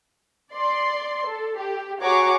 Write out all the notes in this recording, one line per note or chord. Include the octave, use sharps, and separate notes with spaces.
D5 C6
A4
G4
F#4 G#4 C#5 A#5 C#6 D6